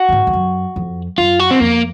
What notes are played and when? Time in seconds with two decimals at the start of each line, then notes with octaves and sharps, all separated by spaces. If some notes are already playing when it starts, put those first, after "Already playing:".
Already playing: F#4
0.09 F#2
0.12 G#2
0.27 F2
0.33 F#2
0.76 F2
1.18 F#2 F4
1.40 F#4
1.51 C4
1.60 F2 A#3